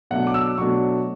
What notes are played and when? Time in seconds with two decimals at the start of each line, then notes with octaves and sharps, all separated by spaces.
0.11 B2 F#3 A3 D4 F#5
0.27 D6
0.34 E6
0.58 B2 F#3 A3 D4 C#6